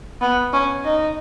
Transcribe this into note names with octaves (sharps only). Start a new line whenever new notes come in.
B3
C#4
D#4